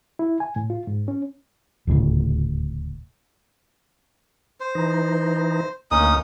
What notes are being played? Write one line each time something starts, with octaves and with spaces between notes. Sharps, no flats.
E4
G#5
A2
F4
G#2
C#4
D#1 D2 A2 C#3
C5
E3 D#4
D2 A#3 C#4 D#4 D#6